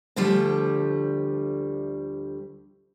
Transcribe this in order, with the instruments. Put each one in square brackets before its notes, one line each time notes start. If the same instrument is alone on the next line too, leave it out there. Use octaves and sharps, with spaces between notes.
[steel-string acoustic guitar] D2 D3 F3 G3 A3